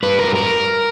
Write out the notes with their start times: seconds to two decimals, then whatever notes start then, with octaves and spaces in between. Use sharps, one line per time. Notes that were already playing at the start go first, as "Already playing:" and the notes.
0.03 G2 B4
0.19 A#4
0.28 G2
0.35 A#4